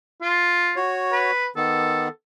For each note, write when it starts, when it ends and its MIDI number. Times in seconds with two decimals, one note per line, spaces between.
0.22 0.77 65
0.76 1.31 66
0.76 1.31 73
1.12 1.47 71
1.56 2.08 51
1.56 2.08 59
1.56 2.08 69